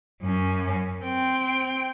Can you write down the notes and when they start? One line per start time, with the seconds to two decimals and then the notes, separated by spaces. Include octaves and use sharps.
0.22 F#2 C#4
1.03 C4 G5